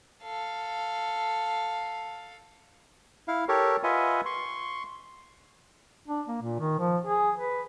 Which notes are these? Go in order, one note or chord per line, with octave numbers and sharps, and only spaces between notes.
A4 F5
E4 F5
G4 A4 A#4 C#5
F4 B4 D#5 E5 F#5 G#5
C6 C#6
D4
A#3
A#2
D#3
F3
G#4
B4